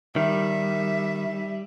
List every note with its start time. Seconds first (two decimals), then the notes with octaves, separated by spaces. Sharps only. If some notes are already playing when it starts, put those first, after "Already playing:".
0.16 D#3 G3 E5